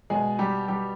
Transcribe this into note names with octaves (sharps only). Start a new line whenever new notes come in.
B2 G#3 G#4
G3 G4
G3 G4